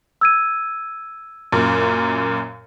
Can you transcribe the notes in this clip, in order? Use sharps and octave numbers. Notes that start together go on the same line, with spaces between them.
E6 G#6 D#7
F#2 A#2